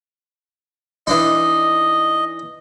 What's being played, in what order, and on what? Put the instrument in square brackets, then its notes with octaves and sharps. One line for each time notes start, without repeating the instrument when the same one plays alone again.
[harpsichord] E3 D4 D#4 [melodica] D#5